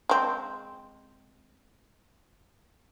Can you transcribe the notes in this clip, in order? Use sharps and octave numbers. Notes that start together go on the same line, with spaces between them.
G#3 C4